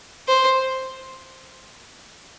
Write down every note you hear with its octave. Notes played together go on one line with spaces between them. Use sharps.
C5